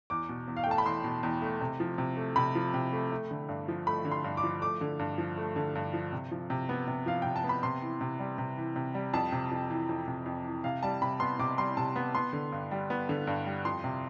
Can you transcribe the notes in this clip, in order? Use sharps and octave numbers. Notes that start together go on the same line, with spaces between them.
E2 D6
B2
E2
F5
G5
A3 A5
B5
E2 C6
B2
E2
A3
C3
F3
C3
A3
C3 B5
F3
C3
A3
A3
D3
G2
F3
A3 B5
D3
C6
G2
D6
F3
A3 D6
D3
G2
F3
A3
D3
G2
F3
C3
F3
C3
B3
C3
F3 F5
C3 G5
A5
B3
B5
C3 C6
E3
C3
G3
C3
E3
C3
G3
F2 A5
C3
F2
E3
F2
C3
F2
E3
C3 F5
G3 A5
C3 B5
B3 C6
C3 D6
G3 C6
C3 A5
B3
B3 C6
D3
G2
G3
B3
D3
G2
G3
F2 C6
C3